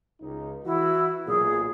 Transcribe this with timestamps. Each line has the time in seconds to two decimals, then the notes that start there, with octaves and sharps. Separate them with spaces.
0.22 C#2 D#4
0.65 E3 E4 F#4
1.26 B1 A#2 G#4